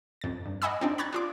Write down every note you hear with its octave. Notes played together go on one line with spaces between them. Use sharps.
F2 A6
G2
D#5 F#5 G#5 B5 D6 E6
C4 D4 D#4
A#5 B5 C#6 F#6 G#6 A6
D4 F4 D6